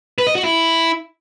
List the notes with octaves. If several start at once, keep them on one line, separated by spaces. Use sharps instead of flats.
B4
D#5
F#4
E4